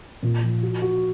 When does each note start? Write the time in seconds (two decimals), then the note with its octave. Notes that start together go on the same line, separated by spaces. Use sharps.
0.23 A#2
0.43 F3
0.63 F#4
0.82 F#4